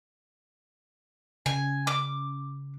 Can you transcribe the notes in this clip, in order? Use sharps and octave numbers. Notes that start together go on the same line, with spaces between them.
C#3 G#5
D6